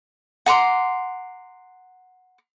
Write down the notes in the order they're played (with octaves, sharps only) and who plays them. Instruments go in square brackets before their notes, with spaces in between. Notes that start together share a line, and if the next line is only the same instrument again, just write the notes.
[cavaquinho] F#5 A#5 C6 D6